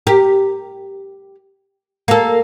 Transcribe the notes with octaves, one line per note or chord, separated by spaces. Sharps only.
G4 A#4
A#3 A4